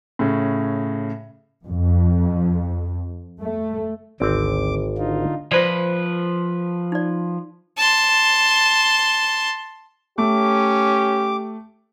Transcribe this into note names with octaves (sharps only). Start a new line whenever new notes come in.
A2 C#3
F2
A3
G#1 D2 C4 D6
D3 D#4 F4
F3 F4 B4 C5 D5
D#4 D5
A5 C6
A3 C#4 G4 D6